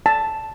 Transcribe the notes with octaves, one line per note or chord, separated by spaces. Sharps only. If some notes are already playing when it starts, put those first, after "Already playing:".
A5